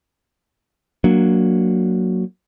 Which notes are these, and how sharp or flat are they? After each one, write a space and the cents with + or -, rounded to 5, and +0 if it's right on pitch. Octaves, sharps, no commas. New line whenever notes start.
F#3 +0 A#3 +0 D4 +0